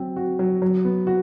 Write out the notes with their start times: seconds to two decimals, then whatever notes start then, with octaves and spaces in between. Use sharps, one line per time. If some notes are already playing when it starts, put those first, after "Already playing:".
Already playing: F#3 C4
0.16 F#4
0.39 F#3
0.62 F#3
0.85 B3
1.07 F#4